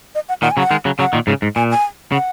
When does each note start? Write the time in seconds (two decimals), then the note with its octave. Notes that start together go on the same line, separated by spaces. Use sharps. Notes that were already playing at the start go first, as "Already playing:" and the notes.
0.15 D#5
0.29 F#5
0.42 A#2 D#3 F#5
0.51 G#5
0.57 C#3 F#3 F#5
0.71 D#3 G#3
0.85 C#3 F#3
0.99 C#3 F#3 F#5
1.13 A#2 D#3
1.27 G#2 C#3
1.42 G#2
1.56 A#2 G#5
1.71 G#5
2.12 C#3 F#5